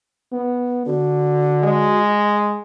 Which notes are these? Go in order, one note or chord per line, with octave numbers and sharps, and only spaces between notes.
B3
D3 F#4
G#3